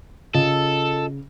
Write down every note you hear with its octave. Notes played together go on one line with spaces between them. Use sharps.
C#3 F4 A4 D#5